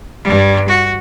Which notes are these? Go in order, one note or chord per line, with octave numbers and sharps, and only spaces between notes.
G2 G3
F#4